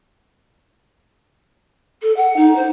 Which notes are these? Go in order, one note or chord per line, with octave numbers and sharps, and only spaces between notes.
A4
F#5
D#4
C5